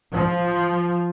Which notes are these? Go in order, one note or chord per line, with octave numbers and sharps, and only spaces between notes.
F3